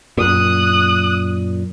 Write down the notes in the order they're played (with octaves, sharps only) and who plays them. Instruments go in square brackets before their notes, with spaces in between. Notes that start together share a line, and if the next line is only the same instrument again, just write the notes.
[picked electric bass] F#2 A#2 [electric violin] D#6 F#6